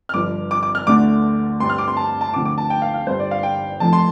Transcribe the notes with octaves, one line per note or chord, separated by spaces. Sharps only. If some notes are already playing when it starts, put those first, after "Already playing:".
F6
G1 G2 F3 D6
D6
D6
F6
D2 D3 A3 D4 D6
G2 G3 C4 C6
F6
D6
C6
A5
A5
D2 D3 F3 C4 D6
D6
A5
G5
F5
F5
G1 G2 G3 C5
D5
F5
G5
F1 F2 F3 A5
C6